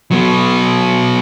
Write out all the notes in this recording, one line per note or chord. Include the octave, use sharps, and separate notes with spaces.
F#3 B3